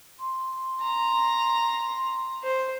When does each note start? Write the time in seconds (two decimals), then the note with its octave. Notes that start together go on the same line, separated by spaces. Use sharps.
0.19 C6
0.82 A#5
2.44 C5